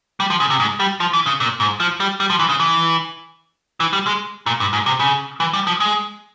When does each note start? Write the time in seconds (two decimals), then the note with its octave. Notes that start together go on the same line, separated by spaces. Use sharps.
0.20 G3
0.30 F3
0.40 C#3
0.50 C3
0.60 G#2
0.80 G3
1.00 F3
1.13 E3
1.26 C#3
1.40 A#2
1.60 G#2
1.80 F3
2.00 G3
2.20 G3
2.30 F3
2.39 E3
2.49 C#3
2.60 E3
3.80 E3
3.93 G3
4.07 G#3
4.46 A#2
4.60 G2
4.73 G#2
4.86 C3
5.00 C#3
5.40 E3
5.53 G3
5.67 F3
5.80 G#3